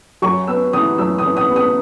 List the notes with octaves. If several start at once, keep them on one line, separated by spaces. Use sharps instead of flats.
F#2 C#6
B3 E6
E3 D#6
F#2 E6
D#6
E3
D#6
B3
D#6